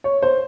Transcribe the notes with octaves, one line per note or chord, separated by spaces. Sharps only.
C#5
C5